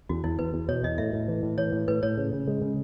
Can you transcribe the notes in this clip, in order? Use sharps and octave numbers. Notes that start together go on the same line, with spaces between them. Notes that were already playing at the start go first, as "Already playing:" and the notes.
E2 F#4
E2 E4
E2 B4
E2
B2 C#5
E2 D#5
A2 E5
A2
E3
A2
E3 C#5
A2
A2 B4
A2 C#5
C#3
C#3
G#3
C#3